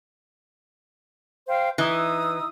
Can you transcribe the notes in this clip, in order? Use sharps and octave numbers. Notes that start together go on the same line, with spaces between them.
C5 F5 G5
E3 D#4 D#6 E6